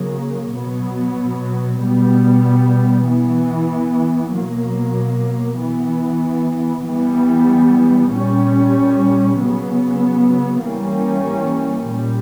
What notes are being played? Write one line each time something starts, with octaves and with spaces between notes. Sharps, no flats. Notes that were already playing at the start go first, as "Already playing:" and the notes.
Already playing: C#3 F#3 A#3
B2 F#3 B3
B2 G3 B3
E3 B3
B2 F#3 A#3
E3 B3
E3 G3 B3
A#2 G3 C#4
C#3 F#3 B3
E3 G3 A#3 C#4
A#2 G3